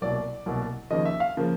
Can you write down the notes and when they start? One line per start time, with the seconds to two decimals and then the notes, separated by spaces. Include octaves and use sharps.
0.01 C2 B2 F#3 A#3 D5
0.46 C2 B2 F#3 A#3
0.90 D#2 C#3 F3 A#3 D#5
1.05 E5
1.20 F5
1.37 C#3 F3 A#3